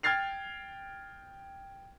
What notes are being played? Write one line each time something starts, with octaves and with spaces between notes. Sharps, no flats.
G5 F6 G#6 A6 C7 F7